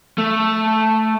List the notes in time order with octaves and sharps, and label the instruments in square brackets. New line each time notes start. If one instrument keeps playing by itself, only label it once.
[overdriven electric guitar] A3